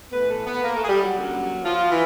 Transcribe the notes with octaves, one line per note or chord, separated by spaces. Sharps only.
A2 E3 A3 B3 B4
A3 A4
B3 B4
A#3 A#4
A3 A4
G#4
G3 G4
F#3 F#4
F#2 D3 G3 A#3
F3 F4
E3